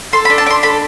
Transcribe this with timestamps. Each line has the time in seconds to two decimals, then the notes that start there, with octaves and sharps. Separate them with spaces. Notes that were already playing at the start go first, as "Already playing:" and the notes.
0.13 A4 C6
0.25 B5
0.30 D4
0.38 A5
0.46 D4 D6
0.50 C6
0.63 A4 B5